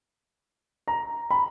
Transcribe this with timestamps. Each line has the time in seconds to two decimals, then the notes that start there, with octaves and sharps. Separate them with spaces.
0.88 A#5
1.31 B5